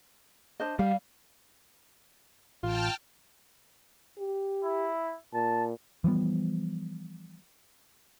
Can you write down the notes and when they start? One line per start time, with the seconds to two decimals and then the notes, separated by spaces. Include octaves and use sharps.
0.60 D4 C5 D#5
0.79 G3 F5
2.63 A1 F4 G5 A5 F6
4.19 G4
4.64 E4
5.34 A#2 A5
6.04 E3 F3 G3 B3